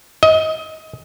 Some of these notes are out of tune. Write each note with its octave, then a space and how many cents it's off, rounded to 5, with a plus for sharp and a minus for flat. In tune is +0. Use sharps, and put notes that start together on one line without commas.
D#5 +25